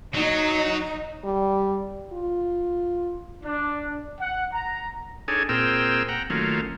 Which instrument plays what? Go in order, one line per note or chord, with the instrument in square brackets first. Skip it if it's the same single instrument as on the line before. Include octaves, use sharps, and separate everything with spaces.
[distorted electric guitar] F#3 [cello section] D#4
[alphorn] G3
F4
[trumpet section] D4
F#5
A#5
[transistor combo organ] D4 D#4 G#4 A4 C#5 G#5
A#2 C4 G#4 A#4 G5 E6
F#5 G5 A#5
D#3 F#3 A3 A#3 C#4 F4